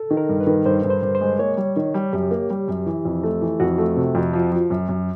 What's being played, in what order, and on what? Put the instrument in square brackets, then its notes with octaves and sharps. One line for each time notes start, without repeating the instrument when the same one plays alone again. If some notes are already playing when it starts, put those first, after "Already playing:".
Already playing: [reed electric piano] A4
[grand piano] D#3
[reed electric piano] A#4
[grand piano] G2
[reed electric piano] B4
[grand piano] D#3
[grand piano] G2 [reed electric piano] C5
[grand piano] G2
[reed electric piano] C5
[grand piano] G2
[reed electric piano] C5
[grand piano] G#3
[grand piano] A#3 [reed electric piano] C#5
[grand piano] G3
D#3
G3
[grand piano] F#2 [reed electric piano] G4
[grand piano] A#3
G3
F#2
E3
F2
A3
E3
[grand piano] F2 [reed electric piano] F#4
[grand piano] A3
C3
F2
F3
F3
F#2
F#2